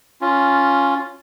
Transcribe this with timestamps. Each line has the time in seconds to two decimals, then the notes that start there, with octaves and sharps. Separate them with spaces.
0.21 C#4 F4